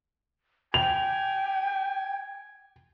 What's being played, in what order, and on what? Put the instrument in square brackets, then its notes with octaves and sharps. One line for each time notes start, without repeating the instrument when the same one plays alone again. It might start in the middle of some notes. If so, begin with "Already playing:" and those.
[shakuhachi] G5 [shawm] G#5 [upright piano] F7